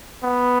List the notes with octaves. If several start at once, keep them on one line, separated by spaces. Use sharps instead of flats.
B3